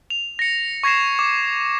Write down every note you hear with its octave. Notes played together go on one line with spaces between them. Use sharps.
F7
A#6 C#7
C#6 G#6 A#6 C7 E7
D6